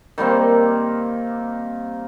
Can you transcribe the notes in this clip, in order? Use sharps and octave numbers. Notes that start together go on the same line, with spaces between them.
D#3 G3 A#3 C4